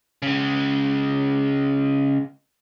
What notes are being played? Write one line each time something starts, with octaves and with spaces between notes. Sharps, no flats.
C#3 G#3